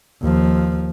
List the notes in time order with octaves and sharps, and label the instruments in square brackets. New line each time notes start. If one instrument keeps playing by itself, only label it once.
[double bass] D#2 F3